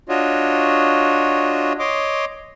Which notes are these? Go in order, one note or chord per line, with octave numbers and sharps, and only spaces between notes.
D4 F4 F#4 C#5 D#5
C#5 D#5 C6 D6